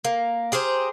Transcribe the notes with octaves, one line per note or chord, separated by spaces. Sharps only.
A#3
G4 G#4 A#4 C5